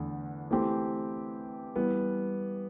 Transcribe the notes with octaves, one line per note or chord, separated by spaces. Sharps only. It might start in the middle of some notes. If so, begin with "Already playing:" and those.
Already playing: E2 D3 A3
E3 A3 C4 G4
E3 G3 B3